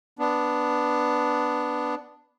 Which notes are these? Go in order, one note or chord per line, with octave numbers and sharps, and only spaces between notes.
B3 D4